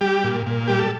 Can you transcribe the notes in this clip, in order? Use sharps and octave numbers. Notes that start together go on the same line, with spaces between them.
G3 G4
A#2
A#2
G3 G4
A4